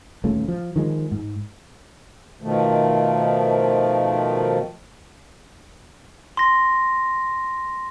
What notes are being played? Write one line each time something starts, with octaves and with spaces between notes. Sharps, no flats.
D#1 C#2 C#3 A3
F3
D#3 F3 G#3
G#2
B2 D#3 F3 A3
C6 A#6